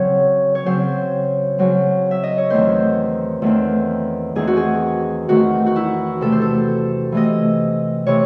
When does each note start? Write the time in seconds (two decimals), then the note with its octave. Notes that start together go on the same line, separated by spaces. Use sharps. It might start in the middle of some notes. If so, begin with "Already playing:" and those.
Already playing: C#3 F#3 C4 C#5
0.55 C#5
0.66 C#3 F#3 C4 C5
1.58 C#3 F#3 C4
2.11 E5
2.24 D#5
2.38 C#5
2.50 E2 D#3 A3 C4 C5
3.42 E2 D#3 A3 C4
4.35 E2 D#3 A3 C4 G#4
4.47 F#4
4.57 G#4
5.28 E2 D#3 A3 C4 F#4
5.66 F#4
5.76 E4
6.21 C3 E3 A3 A4
6.32 C5
6.42 A4
7.12 C3 E3 A3 D#5
8.06 C3 E3 A3 C#5